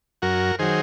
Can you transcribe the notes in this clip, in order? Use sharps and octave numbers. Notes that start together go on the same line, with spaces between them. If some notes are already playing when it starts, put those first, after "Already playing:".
F#2 F#4 A#4
D#3 F#3 G#4 C5